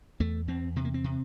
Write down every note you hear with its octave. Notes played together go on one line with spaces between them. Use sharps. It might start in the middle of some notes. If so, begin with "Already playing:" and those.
E2 A3
E2 C4
C3 C4
A#3
C4
C3